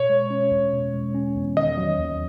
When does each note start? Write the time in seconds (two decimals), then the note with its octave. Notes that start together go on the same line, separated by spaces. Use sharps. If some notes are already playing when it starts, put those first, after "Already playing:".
Already playing: B2 C#5
0.10 G#3
0.30 C#4
0.51 E2
0.73 B2
0.93 G#3
1.15 C#4
1.36 E2
1.56 D#3 D#5
1.77 F#3
1.99 D#2